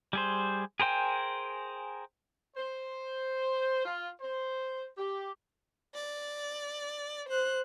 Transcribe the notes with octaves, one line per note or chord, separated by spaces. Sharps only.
G3 G#4 C5
G#4 A#4 C5 G5 G#5
C5
F4
C5
G4
D5
C5 F#6